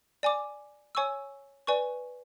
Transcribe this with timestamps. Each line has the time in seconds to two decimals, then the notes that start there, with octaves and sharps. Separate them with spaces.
0.23 D5 G#5 D6
0.95 C#5 G#5 C#6 E6
1.67 B4 D5 G#5 C#6